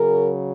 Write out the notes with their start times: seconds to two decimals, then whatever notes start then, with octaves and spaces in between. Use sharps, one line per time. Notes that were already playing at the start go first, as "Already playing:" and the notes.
Already playing: C#3 F#3 G#4 A#4